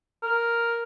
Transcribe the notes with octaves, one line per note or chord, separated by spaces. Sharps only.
A#4